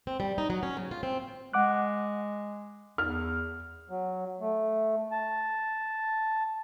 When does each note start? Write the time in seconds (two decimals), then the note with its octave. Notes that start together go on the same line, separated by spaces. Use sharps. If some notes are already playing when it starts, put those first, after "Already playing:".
0.07 C4
0.20 G3
0.38 D#4
0.50 F#3
0.63 C#4
0.77 C#3
0.91 F4
1.03 C4
1.53 G#3 F#5 D6 F#6
2.98 E2 F6
3.90 F#3
4.40 A3
5.12 A5